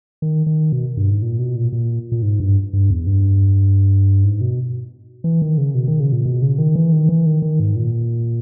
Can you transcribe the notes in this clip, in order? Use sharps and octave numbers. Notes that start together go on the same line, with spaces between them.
D#3
D#3
B2
G2
G#2
A#2
B2
A#2
A#2
A#2
G#2
G2
G2
E2
G2
G#2
B2
E3
D#3
C#3
B2
D#3
C#3
A#2
B2
C#3
D#3
E3
D#3
E3
D#3
D#3
G#2
A#2